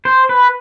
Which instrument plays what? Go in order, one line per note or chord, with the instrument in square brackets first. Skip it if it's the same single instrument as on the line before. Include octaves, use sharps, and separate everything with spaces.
[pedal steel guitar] C5
B4